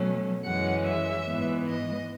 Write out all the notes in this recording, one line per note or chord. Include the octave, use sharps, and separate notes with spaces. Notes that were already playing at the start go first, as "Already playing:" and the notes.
Already playing: B2 F#3 A3 C#4
F#2 E3 G#3 C#4 F#5
E5
G#2 E3 G#3 B3
D#5